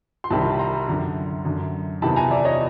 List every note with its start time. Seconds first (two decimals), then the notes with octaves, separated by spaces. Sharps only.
0.24 C6
0.30 C2 C3 D#3 A5 B5
0.54 B5
0.59 A#5 C6
0.88 F#2 D3
1.45 F#2 D3
2.02 E2 C3 D#3 A5 B5
2.16 G#5 A#5
2.31 D5 E5
2.45 C#5 D#5